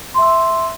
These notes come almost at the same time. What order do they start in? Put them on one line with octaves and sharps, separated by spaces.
C6 E5 E6